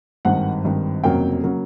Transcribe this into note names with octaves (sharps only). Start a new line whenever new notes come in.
G#1 G2 D#3 F#5
G#1 G2 D#3
F1 F2 C#3 F#3 A#3 G5
C#3 F#3 A#3